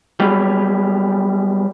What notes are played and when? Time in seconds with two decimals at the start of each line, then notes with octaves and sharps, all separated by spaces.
0.20 F#3 G3 B3 G4 G#4